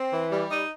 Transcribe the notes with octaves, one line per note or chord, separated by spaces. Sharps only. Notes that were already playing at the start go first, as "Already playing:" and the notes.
Already playing: C4
E3
G3
D#4